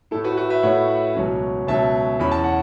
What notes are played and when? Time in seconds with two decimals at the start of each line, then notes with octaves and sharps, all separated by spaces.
0.11 A2 A3 E4 A4
0.24 F#4 B4
0.37 F#4 B4
0.50 B4 E5
0.63 A2 A3 E4 C#5 F#5
1.15 C#2 B2 F#3 C#4
1.67 C#2 B2 F#3 C#4 E5 A5
2.19 E2 E3 C#4 B5
2.31 A5
2.44 F#5